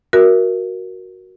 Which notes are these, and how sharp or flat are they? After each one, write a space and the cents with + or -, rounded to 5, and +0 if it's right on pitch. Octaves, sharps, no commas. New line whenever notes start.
F#4 +0 A#4 +5 E5 +0